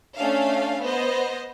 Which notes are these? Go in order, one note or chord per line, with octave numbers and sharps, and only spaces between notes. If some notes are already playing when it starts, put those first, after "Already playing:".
A3 C#4 D4 F5
B3 C5 D#5